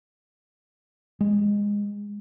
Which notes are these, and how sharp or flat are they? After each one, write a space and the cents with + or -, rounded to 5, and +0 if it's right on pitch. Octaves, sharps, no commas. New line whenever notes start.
G#3 -15